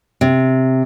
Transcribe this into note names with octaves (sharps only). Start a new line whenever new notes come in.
C3